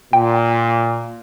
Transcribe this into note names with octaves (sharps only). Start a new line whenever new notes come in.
A#2 G5